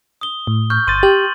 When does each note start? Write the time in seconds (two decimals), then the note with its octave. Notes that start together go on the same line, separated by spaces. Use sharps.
0.21 D#6 G7
0.47 A2
0.70 C#6 F6 G6
0.87 G1 C6 A6 D#7
1.03 G4 A6 F#7